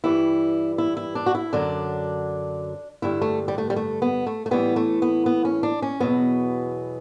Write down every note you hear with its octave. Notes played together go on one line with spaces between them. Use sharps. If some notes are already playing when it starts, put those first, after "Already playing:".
G2 E3 G3 E4
E4
E4
D4
F#4
E4
F#2 D3 F#3 D4
G2 D3 G3 E4
A3
G3
A3
G3
A3
B3
A3
A3
A2 E3 G3 B3
A3
B3
B3
C#4
D4
C#4
E2 B2 F#3 B3